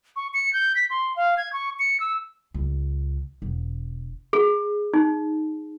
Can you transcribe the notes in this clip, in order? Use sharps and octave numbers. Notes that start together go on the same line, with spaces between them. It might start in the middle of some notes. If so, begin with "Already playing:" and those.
C#6
C#7
G6
B6
C6
F5
G#6
C#6
C#7
E6
C#2
E1
G#4
D#4